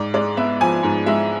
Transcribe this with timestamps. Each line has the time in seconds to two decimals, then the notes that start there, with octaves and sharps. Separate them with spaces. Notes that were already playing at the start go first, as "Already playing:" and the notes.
Already playing: G#2 D5
0.14 G#3 D5
0.37 B3 E5
0.60 F3 G#5
0.83 G#2
1.06 G#3 E5